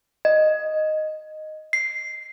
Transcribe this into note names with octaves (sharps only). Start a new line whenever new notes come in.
D#5
C7